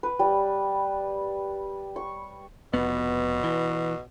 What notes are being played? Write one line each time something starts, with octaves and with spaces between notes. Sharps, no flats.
B4
G3
C#6
F1 B2 B3
E3